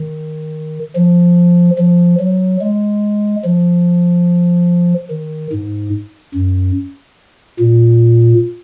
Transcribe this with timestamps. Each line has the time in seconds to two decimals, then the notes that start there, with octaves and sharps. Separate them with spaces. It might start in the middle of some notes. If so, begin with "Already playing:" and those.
Already playing: D#3
0.96 F3
1.78 F3
2.20 F#3
2.61 G#3
3.45 F3
5.10 D#3
5.52 G#2
6.34 F#2
7.59 A#2